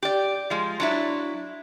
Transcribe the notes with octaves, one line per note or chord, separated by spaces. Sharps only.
G4 D5
F3 G#3
F#3 D4 E4